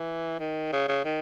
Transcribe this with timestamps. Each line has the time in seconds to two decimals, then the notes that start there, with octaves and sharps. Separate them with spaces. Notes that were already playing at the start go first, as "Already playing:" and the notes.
Already playing: E3
0.40 D#3
0.72 C#3
0.88 C#3
1.05 D#3